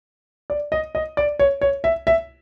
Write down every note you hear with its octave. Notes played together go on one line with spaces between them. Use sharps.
D5
D#5
D#5
D5
C#5
C#5
E5
E5